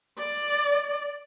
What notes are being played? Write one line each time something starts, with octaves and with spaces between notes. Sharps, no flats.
D5